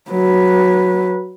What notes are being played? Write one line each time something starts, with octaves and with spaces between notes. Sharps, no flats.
F#3 B4